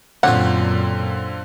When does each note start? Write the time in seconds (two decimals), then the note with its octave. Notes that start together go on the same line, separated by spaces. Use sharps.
0.23 F#2 A#2 D3 C4 F4 G4 C#5 F#5